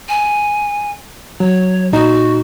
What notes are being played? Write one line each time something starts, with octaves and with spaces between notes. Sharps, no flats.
G#5
F#3 C#5
A#2 D#4 F#4